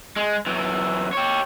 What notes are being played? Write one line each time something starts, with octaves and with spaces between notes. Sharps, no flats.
G#3
F#2 E3
G4 C#5